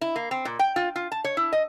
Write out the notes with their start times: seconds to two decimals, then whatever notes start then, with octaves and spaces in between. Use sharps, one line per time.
0.01 E4
0.16 A#3
0.31 C4
0.45 A#2
0.59 G5
0.76 F4
0.96 F4
1.12 A5
1.24 C#5
1.37 E4
1.52 D#5